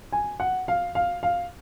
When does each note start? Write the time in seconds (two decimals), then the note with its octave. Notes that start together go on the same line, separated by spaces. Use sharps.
0.13 G#5
0.40 F#5
0.68 F5
0.95 F5
1.23 F5